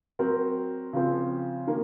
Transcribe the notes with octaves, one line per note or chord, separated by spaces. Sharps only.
F#3 C4 F#4 A#4
C#3 F3 C4
D#3 A#3